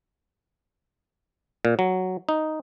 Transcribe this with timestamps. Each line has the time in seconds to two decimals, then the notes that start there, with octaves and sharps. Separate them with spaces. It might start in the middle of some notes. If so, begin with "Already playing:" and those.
1.65 A#2
1.79 F#3
2.29 D#4